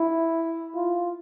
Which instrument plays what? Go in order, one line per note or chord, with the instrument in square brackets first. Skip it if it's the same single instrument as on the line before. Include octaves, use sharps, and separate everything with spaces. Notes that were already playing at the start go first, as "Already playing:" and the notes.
Already playing: [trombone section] E4
F4